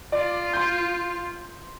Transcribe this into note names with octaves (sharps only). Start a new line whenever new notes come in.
F4 D5
C6 G6